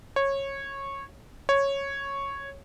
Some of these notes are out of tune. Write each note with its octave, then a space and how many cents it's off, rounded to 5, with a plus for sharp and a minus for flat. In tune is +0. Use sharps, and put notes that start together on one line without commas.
C#5 -15
C#5 -5